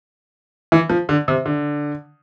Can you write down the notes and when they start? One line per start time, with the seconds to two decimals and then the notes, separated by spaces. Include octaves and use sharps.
0.72 E3
0.90 F3
1.09 D3
1.28 C3
1.46 D3